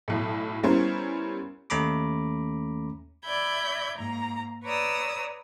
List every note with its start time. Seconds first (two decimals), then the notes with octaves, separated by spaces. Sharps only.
0.08 B1 A2
0.63 G3 B3 C#4 E4 A#4 C5
1.70 D#2 A3 C#4 A#5 B5 D6
3.25 D5 E5 B5 G6 G#6
3.98 G#2 A#3 A#5
4.64 B4 C#5 D5 A#5 D#6 E6